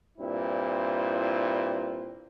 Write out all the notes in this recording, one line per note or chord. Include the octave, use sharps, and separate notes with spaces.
G2 A#2 C4 E4